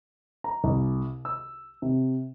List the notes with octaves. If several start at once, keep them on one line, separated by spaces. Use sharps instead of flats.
A#5
C2
E6
C3